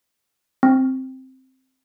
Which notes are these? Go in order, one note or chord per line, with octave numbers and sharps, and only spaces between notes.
C4